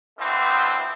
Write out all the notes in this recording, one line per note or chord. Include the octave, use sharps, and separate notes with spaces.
B2 D3 E3 F3 A3 C4